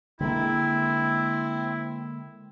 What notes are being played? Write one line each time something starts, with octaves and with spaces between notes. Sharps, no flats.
D3 G#3 A#3 C4 E4